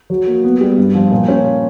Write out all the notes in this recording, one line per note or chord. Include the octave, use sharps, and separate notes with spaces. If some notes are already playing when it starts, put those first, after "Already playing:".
F#3
A#3
B3
G3
G2
F3
A#2
C#4